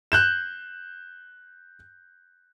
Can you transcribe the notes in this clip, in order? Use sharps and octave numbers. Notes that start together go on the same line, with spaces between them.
F#6 G6 E7